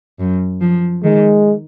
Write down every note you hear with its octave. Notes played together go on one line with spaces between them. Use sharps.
F#2
F3
D#3 G#3